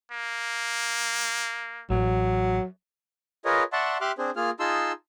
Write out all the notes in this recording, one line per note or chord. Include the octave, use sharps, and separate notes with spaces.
A#3
A1 F#3
F4 G#4 A#4 B4 C#5 D#5
D5 E5 F#5 A5 C6 C#6
G4 E5 C6 D6 F6 F#6
C4 D4 G#4 C5
A#3 F4 G#4 F6
D#4 F4 G#4 A5 C6 E6